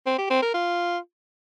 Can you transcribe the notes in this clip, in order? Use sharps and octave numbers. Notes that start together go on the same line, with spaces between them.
C4
G4
C4
A#4
F4